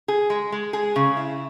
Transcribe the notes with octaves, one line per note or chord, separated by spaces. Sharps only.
G#4
G#3
G#3
G#4
C#3
E4